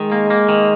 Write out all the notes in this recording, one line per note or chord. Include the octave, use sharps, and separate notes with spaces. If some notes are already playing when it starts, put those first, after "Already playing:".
Already playing: D#3 G#3
A#3
A#3
D#3